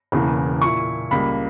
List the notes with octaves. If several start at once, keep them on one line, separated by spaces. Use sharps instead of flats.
E1 E2 C#3 E3 A#3
A#2 A#3 E4 C#6
C#2 C#3 G3 A#3 B5